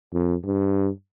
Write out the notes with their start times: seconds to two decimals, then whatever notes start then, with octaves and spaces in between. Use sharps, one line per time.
0.13 F2
0.45 G2